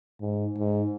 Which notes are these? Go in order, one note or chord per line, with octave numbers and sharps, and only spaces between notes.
G#2
G#2